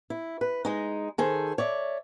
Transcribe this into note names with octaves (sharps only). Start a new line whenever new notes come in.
E4
B4
G#3 D#4
D#3 G#4 A4 C5
C#5 D5 E5